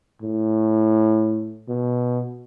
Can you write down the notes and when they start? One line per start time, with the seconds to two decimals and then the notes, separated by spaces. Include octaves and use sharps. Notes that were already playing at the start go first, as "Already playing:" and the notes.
0.22 A2
1.68 B2